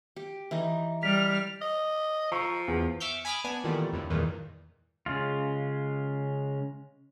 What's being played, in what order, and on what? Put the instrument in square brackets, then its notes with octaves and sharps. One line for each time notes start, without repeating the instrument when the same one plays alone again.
[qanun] G4
E3 D#4
[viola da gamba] G3 [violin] F6 [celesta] B6
[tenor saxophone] D#5
[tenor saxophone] F3 [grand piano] A#5 C#6 E6
[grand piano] E2
[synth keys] E5 C#6 D6 E6 F6 G6
G#5 B5 D6 D#6 F6
B3 D4 G#5
A#2 D#3 E3 G3 A3 B3
F2 A2 D3
E2 G2 A#2 D#3 E3
[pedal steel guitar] C#3 G#3 F4